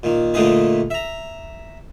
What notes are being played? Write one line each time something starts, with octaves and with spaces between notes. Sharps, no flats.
A#2 D#3
A#2 D3 A3 D#4 G#4 B4
E5 A#5